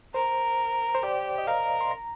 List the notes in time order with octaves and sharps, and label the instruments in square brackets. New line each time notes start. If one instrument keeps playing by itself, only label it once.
[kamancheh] A#4 [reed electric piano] C5
[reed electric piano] C5
[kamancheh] G4 [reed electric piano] D5
[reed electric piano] D#5
[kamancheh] A#4 [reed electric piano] F5
[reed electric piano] C6
A#5